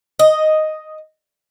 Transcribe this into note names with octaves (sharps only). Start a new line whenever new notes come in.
D#5